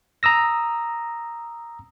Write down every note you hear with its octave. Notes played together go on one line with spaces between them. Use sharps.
A#5 D#6 E6 A#6